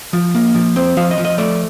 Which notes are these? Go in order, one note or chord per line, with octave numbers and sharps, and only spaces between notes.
F3
A#3
F3
C4
F3 F5
D#5
F3
D#5
A3 D5